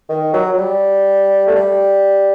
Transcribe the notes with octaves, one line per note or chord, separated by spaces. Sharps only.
D#3
F#3
F#3
G3
A3
G3